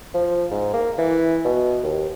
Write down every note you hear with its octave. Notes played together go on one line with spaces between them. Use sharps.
F3
G#2
A#3
E3
B2
D#2